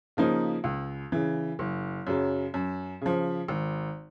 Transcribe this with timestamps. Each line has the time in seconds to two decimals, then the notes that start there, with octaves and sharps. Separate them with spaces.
0.17 C#3 F3 A#3 D#4
0.64 C#2
1.12 C#3 E3
1.59 F#1
2.07 F#2 C#3 F#3
2.54 F#2
3.01 C#3 F3
3.48 G#1